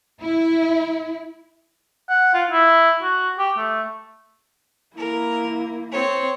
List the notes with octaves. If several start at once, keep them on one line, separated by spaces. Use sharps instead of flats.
E4
F#5
F4
E4
F#4
G4
A3
A#3 E4 A#4
C4 C5 C#5